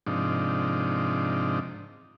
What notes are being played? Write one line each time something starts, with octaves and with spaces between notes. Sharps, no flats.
G#2 C3 F3 D4 D#4